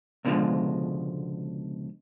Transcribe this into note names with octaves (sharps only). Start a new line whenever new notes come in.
C#2 B2 D3 E3 F3 G#3